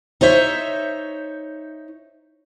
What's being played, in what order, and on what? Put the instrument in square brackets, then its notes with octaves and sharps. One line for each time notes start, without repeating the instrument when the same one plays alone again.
[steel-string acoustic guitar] D#4 C5 C#5 E5